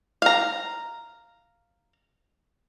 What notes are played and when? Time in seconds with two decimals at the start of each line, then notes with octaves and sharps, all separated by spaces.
0.22 F5 A#5